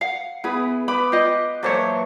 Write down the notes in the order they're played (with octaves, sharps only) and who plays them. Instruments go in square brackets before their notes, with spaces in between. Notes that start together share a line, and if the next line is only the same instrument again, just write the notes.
[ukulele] F5 F#5
[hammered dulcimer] B3 [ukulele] E4 G#4 B4
[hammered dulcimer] B4 D6 [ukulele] B5
[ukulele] F4 D#5 [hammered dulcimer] G5
[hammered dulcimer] A#2 E3 F#3 [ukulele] A4 C5 C#5